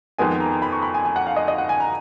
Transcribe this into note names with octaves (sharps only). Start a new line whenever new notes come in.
F2 D#3 G#3 B3 G#5
A#5
B5
C#6
B5
G#5
G#5
F#5
F5
D#5
D#5
F#5
G#5
A#5